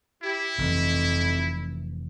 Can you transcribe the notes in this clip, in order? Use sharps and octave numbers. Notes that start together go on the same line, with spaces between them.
E4 G4
F1 F2 E3